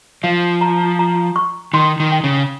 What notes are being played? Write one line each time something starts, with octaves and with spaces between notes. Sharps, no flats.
F3 F5
A#5
A#5
C#6
D#3 C6
D#3
G5
C#3